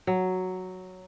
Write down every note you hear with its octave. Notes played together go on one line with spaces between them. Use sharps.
F#3